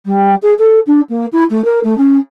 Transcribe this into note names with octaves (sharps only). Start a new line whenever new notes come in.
G3
G#4
A4
D4
A#3
E4
A3
A#4
A3
C#4